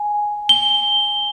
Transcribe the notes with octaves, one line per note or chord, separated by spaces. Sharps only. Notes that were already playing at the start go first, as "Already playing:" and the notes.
Already playing: G#5
G7